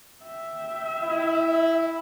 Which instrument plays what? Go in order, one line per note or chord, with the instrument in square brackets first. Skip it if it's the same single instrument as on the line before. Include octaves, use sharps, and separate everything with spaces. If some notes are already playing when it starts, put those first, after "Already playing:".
[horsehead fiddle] E5 G5
[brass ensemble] E4